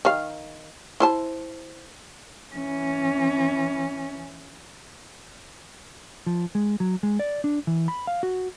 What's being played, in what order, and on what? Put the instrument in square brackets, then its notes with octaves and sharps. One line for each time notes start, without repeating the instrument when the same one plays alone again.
[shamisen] D#3 F5
E4 C5 A5
[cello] E3 C#4
[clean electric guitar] F3
G#3
F#3
G#3
D5
D4
E3
B5
F5
F#4